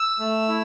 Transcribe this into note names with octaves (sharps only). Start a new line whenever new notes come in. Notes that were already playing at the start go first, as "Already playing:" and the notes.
Already playing: E6
A3
E4